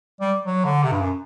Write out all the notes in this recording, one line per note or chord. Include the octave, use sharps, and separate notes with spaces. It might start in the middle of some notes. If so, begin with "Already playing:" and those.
G3
F#3
D3
C3
G2
F#2